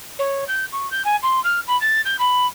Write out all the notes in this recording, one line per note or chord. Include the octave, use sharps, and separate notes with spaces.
C#5
G6
C#6
G6
G#5
C6
F6
B5
A6
G6
B5